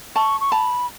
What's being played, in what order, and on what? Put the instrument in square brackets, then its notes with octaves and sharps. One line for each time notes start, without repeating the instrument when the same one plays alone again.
[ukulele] A5 [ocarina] C#6
[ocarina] C#6
[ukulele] A5 [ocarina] B5